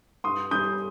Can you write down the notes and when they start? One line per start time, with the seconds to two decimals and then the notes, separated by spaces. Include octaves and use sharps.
0.24 G2 C6 D#6
0.51 G3 C#4 D#6 G6